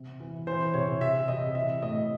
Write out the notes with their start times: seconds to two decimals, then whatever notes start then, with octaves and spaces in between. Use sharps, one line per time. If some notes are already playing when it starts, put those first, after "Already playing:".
Already playing: C3
0.20 E3
0.47 E3 C5
0.74 C3 C#5
1.01 C3 E5
1.28 C3 D#5
1.55 E3 E5
1.82 A2 D#5